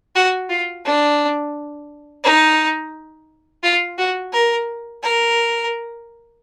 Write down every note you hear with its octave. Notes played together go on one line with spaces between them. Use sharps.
F#4
F4
D4
D#4
F4
F#4
A#4
A#4